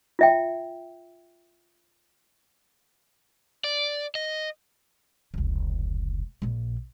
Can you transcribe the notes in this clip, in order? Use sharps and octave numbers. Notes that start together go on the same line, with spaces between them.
F4 E5 G5
D5
D#5
F1 C#2
A#1 A#2